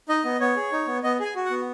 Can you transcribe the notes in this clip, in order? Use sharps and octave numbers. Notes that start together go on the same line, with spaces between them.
D#4 D#5
B3
B3 C#5
G#4
D#4
B3
B3 D#5
G#4
G#5
F#4
F#5
B3